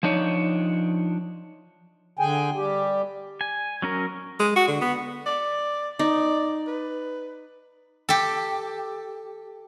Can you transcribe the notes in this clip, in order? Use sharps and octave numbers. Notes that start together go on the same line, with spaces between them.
F3 D4 D#4 C#5
D3 G#4 G5 G#5
G3 G4
G#5
F#3 C#4 A#4
G#3
F#4
D3
B3
D5
D#4 D5
B4
G4 A4